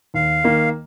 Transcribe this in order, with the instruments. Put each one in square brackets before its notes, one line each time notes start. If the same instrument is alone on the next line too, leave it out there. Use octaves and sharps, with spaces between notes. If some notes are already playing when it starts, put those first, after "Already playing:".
[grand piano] D#2 [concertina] F5
[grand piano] D#3 A#3